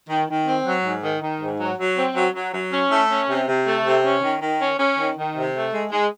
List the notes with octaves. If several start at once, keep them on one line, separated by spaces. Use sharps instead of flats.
D#3
D#3
C4
F#3
G#2
D#3
D#3
G#2
F#3
F#3
C4
F#3
F#3
F#3
C#4
A3
C#4
C3
C3
A3
C3
C#4
D#3
D#3
C#4
C#4
D#3
D#3
C3
A3
G#3
G#3